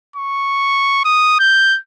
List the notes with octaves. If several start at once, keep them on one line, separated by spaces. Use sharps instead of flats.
C#6
D#6
G6